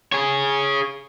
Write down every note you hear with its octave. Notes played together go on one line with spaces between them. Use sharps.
G#4 C#5